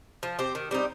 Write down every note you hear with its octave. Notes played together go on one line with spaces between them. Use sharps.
F3
C4 G4
D#3
G3 C4 D#4